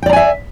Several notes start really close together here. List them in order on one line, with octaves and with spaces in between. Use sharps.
G5 D5 A#5 G#5 E5